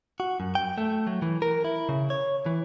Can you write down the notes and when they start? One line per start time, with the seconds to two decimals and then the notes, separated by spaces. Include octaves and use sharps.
0.20 F#4
0.40 F#2
0.55 G5
0.78 A3
1.07 F#3
1.22 E3
1.42 A#4
1.65 E4
1.89 C#3
2.10 C#5
2.46 E3